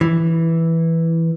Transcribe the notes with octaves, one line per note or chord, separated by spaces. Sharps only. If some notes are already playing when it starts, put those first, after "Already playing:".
E3